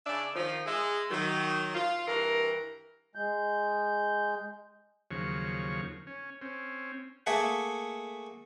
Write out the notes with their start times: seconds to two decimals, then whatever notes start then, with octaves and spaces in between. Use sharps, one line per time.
0.05 C#3 D4 D5 E5
0.35 D#3 F3
0.66 G#3 G#4 E5
1.10 D#3 F#3
1.74 F4
2.07 G2 E3 A#4
3.15 G#3 G6
5.11 D#2 C#3 F3 F#3 C#6
6.07 C#4
6.41 C4 C#4
7.26 A3 A#3 G#4 A4 E5 F#5